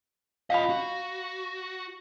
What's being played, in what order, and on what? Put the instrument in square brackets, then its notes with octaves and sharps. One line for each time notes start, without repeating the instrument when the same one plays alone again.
[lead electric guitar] F4 D#5 [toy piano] F5 B5
[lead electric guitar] F#4